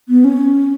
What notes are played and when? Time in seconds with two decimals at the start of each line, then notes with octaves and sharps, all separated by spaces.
0.09 B3
0.24 C#4